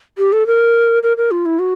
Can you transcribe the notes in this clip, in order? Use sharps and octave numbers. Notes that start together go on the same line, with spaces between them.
G4
A4
A#4
A#4
A#4
F4
E4
F#4